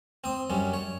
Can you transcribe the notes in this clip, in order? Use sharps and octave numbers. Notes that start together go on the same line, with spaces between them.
C4 D#6
F#2 G3 C#4
C#5